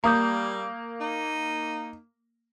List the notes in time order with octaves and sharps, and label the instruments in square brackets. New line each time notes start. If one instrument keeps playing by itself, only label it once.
[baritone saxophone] G3 [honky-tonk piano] A#3 [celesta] A#5 D#6 G6
[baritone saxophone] D#4